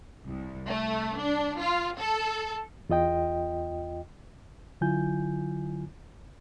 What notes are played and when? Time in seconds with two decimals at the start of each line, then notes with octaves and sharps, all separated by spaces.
0.26 C2
0.69 A3
1.19 D4
1.60 F4
1.98 A4
2.89 E2 F4 D#5 G5
4.81 D3 F#3 E4 F4 G#5 G6